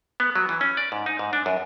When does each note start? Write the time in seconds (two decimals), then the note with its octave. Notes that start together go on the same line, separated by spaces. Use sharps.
0.20 B3
0.36 F#3
0.49 E3
0.61 C#4
0.77 D5
0.92 G#2
1.06 D#4
1.19 G#2
1.33 D4
1.46 F#2